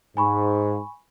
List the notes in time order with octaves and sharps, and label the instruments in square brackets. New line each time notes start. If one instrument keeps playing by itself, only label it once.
[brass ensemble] G#2 [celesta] G#5 B5 C#6